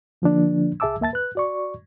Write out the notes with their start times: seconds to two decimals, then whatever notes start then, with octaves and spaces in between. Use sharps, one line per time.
0.22 D3 F3 A#3 D4
0.80 C2 G#4 E5 A5 D6 E6
1.00 D2 A#3 E5 A5 A6
1.13 B4 F#6
1.35 F#4 D5 C#6